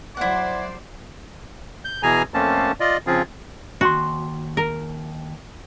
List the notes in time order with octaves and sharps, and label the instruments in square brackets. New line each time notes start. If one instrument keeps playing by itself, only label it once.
[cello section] F#3 C5 D5 [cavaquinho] E4 F#5
[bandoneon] G6
B2 E3 G#4 G#5 A#5
F2 A3 A#3 C4 C#4 A5
F4 D5 D#5
C#3 F3 C4 F4 G#4
[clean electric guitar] D#2 C6 [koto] F#4
[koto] A#4